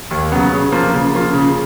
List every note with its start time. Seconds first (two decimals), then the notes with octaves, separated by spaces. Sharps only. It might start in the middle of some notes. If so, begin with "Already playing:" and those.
0.11 D#2
0.32 C#3 F#3 B3
0.52 C#3
0.72 F3 A#3 F4
0.94 C#3
1.14 F3 A#3 F4
1.33 C#3